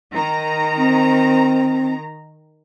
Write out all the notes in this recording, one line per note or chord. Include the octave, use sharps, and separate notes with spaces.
D#3 A#5
C4